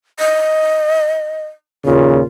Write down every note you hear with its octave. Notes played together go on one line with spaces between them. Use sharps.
D#5
D#2 A#2 C#3 F4